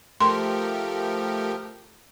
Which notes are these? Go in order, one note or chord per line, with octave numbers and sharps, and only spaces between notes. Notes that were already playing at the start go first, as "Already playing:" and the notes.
F3 A3 G4 A#4 C6